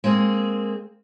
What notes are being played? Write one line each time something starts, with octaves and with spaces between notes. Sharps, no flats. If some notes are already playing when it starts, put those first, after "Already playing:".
G#3 A#3 C4 G#4